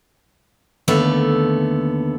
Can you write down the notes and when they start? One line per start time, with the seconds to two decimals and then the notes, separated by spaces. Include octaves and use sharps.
0.88 D#2 D3 A3 B3